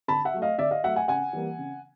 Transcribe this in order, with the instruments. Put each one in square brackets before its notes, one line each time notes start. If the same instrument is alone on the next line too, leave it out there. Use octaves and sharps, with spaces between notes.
[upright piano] D3 A5 B5
E5 F#5
F#3 A3
D#5 F5
D3 D5 E5
D#5 F5
F#3 A3 E5 F#5
F#5 G#5
C#3 F#5 G#5
E3 G3 A#3
C#3